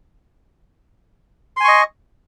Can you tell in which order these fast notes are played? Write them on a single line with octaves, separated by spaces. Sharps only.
C6 G#5 C#6 D#5